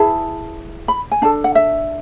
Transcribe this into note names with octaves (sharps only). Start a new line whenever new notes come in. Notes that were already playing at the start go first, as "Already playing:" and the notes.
Already playing: E4 G#4 B4 A5
B5
G#5
D4 A4 A5
F#5
E5